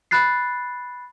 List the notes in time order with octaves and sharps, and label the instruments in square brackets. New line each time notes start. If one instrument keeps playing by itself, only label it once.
[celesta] B5 F#6 A6 C7